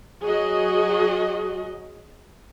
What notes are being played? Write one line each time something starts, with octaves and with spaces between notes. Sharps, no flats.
F#3 F#4 G#4 D#5